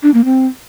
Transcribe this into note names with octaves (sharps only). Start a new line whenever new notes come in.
D4
A#3
C4